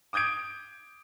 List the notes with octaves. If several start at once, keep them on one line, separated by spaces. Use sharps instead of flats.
D6 D#6 G6 G#6 D7